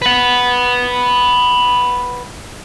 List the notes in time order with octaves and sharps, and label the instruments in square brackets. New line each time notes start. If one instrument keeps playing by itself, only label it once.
[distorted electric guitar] B4 F#5